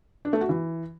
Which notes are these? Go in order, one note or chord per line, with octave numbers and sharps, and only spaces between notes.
D4
A3
F#4
E3